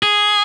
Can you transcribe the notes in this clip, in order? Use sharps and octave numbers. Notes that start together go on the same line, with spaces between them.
G#4